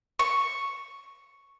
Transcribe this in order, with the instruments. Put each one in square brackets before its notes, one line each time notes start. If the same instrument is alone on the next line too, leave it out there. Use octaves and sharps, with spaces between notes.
[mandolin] C#6